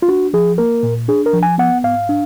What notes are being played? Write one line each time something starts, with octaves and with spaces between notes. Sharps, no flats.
F4
D4 F#4
F3 G#4
A#3 A#4
A#2
D4 G#4
A#4
F3
G#5
B3 F#5
G#2 F5
D4